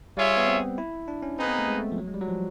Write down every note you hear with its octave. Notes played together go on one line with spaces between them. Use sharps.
G3 F4 G#4 C#5 E5
B3
C4
E4
D4
C#4
A#3 C4 D#4 G#4 B4
B3
A3
G#3
A3
F3
F#3
G#3
G3
F#3
F3